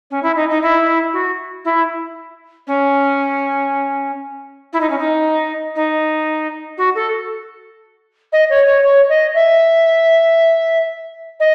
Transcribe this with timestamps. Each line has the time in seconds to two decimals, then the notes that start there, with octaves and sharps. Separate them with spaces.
0.10 C#4
0.22 E4
0.35 D#4
0.49 D#4
0.62 E4
1.13 F#4
1.64 E4
2.67 C#4
4.72 E4
4.80 D#4
4.89 C#4
4.98 D#4
5.75 D#4
6.77 F#4
6.95 A4
8.32 D#5
8.49 C#5
8.66 C#5
8.82 C#5
9.09 D#5
9.34 E5
11.39 D#5